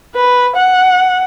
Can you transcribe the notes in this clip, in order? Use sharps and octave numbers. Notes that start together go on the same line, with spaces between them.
B4
F#5